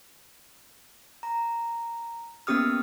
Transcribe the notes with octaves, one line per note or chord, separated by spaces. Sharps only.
A#5
A#3 B3 C#4 G4 D#6 F6